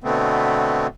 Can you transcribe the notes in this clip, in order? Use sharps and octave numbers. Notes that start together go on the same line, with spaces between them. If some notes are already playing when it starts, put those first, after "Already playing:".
B2 D3 A3 B3 C4